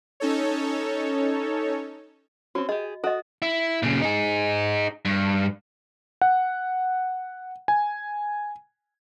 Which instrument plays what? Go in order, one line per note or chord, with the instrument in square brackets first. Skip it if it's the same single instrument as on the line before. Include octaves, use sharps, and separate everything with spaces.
[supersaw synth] C#4 D#4 A4 C#5
[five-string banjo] C4 C#4 [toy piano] F#4
[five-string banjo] G4 G#4 [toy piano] D#5
[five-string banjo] F#4 [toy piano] A4 D#5
[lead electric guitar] E4
A#2 C#3
D#4 G#4
G2
[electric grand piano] F#5
G#5